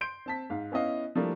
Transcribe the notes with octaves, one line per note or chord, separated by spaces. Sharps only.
C6 G6 D7
C4 A5 B6
G#2 F5
B3 C#4 E4 D#5 F5
F3 G3 A3 A#3 D4 E4